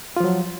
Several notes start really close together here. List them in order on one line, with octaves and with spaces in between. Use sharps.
F4 F3 F#3